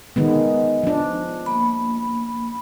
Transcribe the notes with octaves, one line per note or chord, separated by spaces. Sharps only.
D#3 G#3 B3
F3 D4
A#3 B5